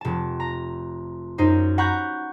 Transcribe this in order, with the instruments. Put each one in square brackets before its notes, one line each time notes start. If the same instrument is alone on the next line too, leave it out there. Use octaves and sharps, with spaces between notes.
[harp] F1 A5
A#5
F#2 D#4 C5
F#5 A#5 B5 C#6 F#6 G6